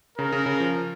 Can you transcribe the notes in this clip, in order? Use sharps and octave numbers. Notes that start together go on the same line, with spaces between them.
C#3 A#4
C#3
C#3
F3